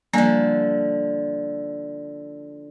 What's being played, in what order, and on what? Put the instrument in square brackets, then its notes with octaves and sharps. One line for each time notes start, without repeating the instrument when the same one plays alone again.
[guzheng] D3 F3 [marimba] G3 A#3 G#5